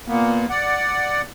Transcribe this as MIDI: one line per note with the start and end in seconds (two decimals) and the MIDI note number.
0.08 0.47 46
0.08 0.47 58
0.08 0.47 59
0.50 1.22 74
0.50 1.22 78